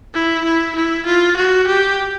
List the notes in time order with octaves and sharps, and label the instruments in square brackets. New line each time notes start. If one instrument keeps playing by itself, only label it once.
[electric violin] E4
E4
E4
F4
F#4
G4